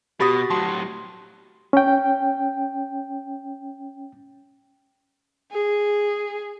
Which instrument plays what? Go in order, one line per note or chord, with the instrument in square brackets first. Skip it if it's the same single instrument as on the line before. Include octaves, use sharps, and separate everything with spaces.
[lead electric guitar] B2 [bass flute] F#4 [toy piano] G4 D#6 [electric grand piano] B5 A6 A#6
[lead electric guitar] A2 F#3 [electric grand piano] A5 C6
[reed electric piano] C#4 G5
[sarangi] G#4